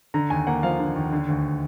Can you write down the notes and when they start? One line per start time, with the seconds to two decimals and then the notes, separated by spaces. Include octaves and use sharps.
0.14 D3 A#5
0.30 D#2 G#5
0.47 A#3 F#5
0.63 F3 F5
0.79 D3
0.96 D#2
1.12 D3
1.28 D2